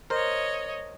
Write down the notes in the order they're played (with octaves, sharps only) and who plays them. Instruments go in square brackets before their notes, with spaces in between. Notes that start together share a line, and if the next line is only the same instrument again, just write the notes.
[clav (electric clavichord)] A#4 C5 [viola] C#5 D#5